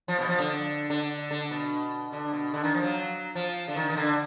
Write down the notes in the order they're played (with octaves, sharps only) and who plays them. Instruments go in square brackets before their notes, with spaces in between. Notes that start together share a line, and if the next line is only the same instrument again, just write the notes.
[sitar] F3
B2
F3
D3
D3
D3
B2
D3
B2
D3
D#3
F3
F#3
F3
D3
D#3
D#3
D3